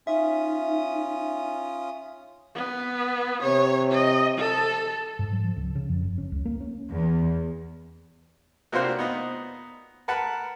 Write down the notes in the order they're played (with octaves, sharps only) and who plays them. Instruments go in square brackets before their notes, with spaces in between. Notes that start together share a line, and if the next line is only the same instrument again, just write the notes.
[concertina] C#4 F4 D#6 [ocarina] D#4 [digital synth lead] E5
[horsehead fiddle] B3
[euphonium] C3 [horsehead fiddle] C#5
[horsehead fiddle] D#5
A4
[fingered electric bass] G#2
F#3
F3
C#2
C#3
F2
F#1
C#4
C#2
A#3
C#4
[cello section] E2
[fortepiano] C3 A#3 D4 F4 F#4 C5
B3 D#4 D#5
A#4 B4 F#5 A5 B5